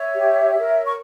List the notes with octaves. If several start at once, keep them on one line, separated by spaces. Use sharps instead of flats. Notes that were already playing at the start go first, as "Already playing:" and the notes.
Already playing: C#5 E5
G4
A#4 C#5
C#6